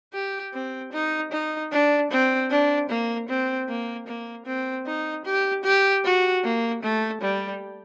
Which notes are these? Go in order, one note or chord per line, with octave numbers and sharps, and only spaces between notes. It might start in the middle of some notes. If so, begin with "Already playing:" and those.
G4
C4
D#4
D#4
D4
C4
D4
A#3
C4
A#3
A#3
C4
D#4
G4
G4
F#4
A#3
A3
G3